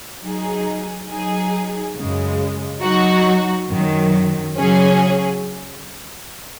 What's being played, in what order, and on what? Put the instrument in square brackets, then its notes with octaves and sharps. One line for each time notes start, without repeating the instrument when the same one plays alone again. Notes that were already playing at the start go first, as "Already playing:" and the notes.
[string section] F#3 D#4 G#4
F#3 D#4 G#4
F#2 C#3 G#3
F#3 D#4 F#4
F#2 D#3 F#3
C#3 F#3 C#4 G#4